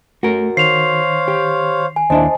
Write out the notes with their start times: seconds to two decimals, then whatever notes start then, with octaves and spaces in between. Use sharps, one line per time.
0.23 A3 F#4 A#4
0.57 D#3 C5 C#5 F5 C7 F7
1.28 G4
1.96 G#5
2.10 D#2 D4 E4 C5 D#5 A5